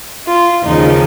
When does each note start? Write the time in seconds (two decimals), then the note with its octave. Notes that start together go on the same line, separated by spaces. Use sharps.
0.26 F4
0.64 D#2 C#3 F3 G#3 D#4